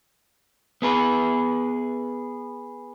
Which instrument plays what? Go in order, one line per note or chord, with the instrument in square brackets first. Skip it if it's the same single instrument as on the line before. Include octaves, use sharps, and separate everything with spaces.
[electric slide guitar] B3 G#4 B4